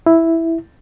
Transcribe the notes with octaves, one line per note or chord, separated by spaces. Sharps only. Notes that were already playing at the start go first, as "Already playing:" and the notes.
E4